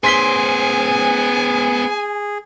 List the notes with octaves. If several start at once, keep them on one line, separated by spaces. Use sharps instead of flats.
B3 G#4 C5 G#5 C6 B6 G7